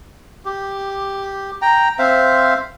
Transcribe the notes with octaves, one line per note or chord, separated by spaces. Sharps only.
G4
G5 A#5
C4 C5 E5 F5